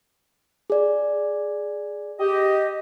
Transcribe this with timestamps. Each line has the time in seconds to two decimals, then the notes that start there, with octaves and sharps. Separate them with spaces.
0.70 G#4 D5
2.20 G4 D#5